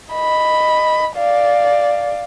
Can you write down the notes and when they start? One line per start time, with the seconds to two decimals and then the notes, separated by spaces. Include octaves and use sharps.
0.12 D#5 B5
1.17 D5 F5